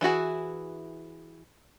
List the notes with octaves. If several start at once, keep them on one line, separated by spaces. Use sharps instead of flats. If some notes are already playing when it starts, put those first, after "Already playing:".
E3 E4 F#4 G#4